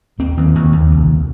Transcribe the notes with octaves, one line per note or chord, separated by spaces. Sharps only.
D#2 C4
D#2
D#2
D#2
C2